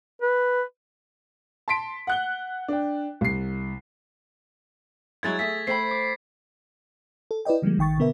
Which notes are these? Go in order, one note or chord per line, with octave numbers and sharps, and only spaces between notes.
B4
A5 C6 B6 D7
F#5 F#6 G7
D4 G5
C2 C7
F#3 G#3 E4 G#6 A6
A3 G#4 E5 B6
A3 C5 G5 B5 C7
D6
A4
E4 B4 D5 D#5 G5
D3 F3 G3 G#3 A#3
A1 D#3 G5 C#6 A6
B2 D3 B3 A#4 E5